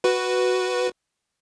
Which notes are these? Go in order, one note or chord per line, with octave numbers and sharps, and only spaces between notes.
F#4 B4